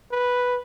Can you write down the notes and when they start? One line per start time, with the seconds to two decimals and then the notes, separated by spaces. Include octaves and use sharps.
0.12 B4